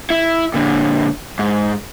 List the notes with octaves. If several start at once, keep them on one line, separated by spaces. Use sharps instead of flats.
E4
A#2 D3
G#2